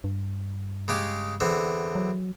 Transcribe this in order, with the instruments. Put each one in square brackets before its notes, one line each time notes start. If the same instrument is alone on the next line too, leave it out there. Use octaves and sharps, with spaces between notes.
[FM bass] G2
[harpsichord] C#3 G#3 G4
E2 D3 C4
[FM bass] F#3